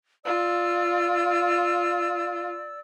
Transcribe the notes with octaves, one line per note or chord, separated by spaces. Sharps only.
F4 D5 E6